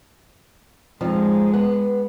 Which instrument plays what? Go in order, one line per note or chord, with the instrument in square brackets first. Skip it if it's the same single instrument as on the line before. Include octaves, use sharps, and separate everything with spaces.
[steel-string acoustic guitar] F2 F3 D#4 [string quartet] G#3
[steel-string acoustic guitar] B3 F#5